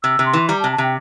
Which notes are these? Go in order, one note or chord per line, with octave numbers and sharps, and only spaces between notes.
C3 E6
C3
C6
E3
G3 A#5
A5
C3
A5
C3 G5